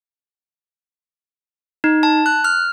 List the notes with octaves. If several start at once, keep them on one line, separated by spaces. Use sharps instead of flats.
D#4
A5
F#6
F6